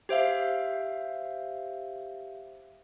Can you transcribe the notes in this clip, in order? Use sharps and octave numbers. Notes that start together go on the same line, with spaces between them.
G4 C5 E5 F5